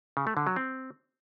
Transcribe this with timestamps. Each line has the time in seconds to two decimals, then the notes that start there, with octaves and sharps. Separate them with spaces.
0.17 C#3
0.27 A3
0.37 D3
0.47 F#3
0.56 C4